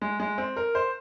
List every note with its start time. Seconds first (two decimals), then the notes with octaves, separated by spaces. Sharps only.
0.02 G#3
0.20 G#3
0.38 C4
0.56 A#4
0.75 C5